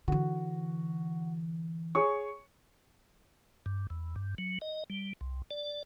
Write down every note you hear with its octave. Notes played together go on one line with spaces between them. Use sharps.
D3 E3 F#4
G#4 C#5 C#6
G2
E2
G2
F#3
D#5
G3
C2
D5